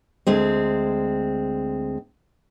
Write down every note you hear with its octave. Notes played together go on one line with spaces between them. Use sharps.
D2 G#3 C4